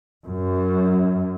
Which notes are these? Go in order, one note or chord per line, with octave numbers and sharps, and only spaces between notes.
F#2